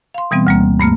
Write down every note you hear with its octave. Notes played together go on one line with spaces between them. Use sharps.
F5 C6
B2 E3 G3 B3 C4
D2 G3 A#3
G2 A3 A#3 F6